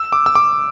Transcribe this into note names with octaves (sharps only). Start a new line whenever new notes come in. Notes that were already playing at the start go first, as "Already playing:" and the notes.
Already playing: E6
D6
E6
D6